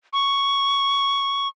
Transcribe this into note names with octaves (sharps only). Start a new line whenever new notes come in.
C#6